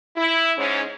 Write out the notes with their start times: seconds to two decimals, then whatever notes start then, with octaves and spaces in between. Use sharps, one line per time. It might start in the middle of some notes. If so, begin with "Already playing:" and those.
0.17 E4
0.58 G#2 C#4